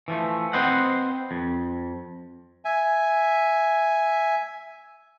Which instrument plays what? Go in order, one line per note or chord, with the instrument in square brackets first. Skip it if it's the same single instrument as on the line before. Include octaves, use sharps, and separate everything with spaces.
[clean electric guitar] E3 F3 A3
C4 B4 C5 D#5 F#5
F2
[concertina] E5 G#5